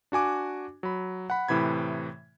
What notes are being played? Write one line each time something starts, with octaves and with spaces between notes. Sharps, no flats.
D4 F#4 G#5 D6
F#3 B5
F#5 B5
A2 C3 E3 B5 G#6